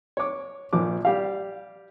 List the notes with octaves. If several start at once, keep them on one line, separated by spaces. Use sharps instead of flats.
C#5 D6
A#1 F3 D6
G3 G4 F5